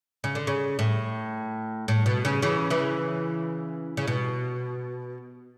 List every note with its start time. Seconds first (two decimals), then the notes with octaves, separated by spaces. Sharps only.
0.24 C#3
0.35 D3
0.47 C#3
0.79 A2
1.88 A2
2.06 B2
2.25 C#3
2.42 C#3 E3
2.70 C#3 E3
3.97 C#3
4.07 B2